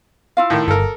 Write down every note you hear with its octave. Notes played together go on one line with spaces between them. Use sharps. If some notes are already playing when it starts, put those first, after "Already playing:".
E4 F4 F5
A2 D#3
G1 A4 A#4